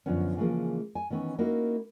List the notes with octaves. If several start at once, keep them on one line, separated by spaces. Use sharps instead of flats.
F#2 D3 F3 B3 C#4
C#3 E3 F3 G#3 A#3
G#5
D#3 E3 B3 C#4
A#3 C#4 D#4 E4 F#4 A#4